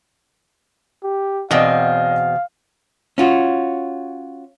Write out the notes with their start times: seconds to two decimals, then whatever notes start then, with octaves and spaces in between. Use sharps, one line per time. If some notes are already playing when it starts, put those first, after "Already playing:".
1.04 G4
1.51 E2 B2 C4 D5 D#5 F5
3.18 C#4 F4 F#4